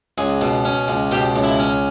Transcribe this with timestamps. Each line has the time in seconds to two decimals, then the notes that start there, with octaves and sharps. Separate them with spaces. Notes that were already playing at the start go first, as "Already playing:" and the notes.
0.18 C#2 G#4
0.41 B2
0.65 C#4
0.88 C#2
1.11 B2 G4
1.36 C#2
1.44 E4
1.59 C#4